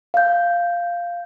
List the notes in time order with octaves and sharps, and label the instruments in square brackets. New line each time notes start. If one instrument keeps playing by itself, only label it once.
[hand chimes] F5 G6